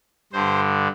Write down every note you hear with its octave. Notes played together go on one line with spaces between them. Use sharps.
G2 D3 C5